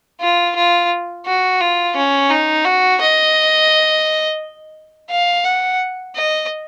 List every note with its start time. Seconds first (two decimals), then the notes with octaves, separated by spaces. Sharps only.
0.21 F4
0.56 F4
1.26 F#4
1.61 F4
1.96 C#4
2.30 D#4
2.65 F#4
3.01 D#5
5.10 F5
5.45 F#5
6.15 D#5